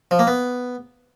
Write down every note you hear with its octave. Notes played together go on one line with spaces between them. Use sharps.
F3
A#3
B3